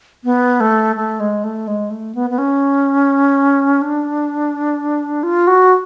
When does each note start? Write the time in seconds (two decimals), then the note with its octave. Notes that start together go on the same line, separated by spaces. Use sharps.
0.24 B3
0.60 A3
0.96 A3
1.20 G#3
1.44 A3
1.68 G#3
1.90 A3
2.15 B3
2.30 B3
2.38 C#4
3.82 D4
5.23 F4
5.47 F#4